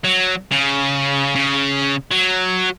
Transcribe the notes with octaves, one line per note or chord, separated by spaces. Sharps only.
F#3
C#3
C#3
F#3